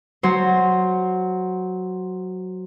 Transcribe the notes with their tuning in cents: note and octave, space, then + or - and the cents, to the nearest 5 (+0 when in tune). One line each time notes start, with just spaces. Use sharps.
F#3 +0 C5 +5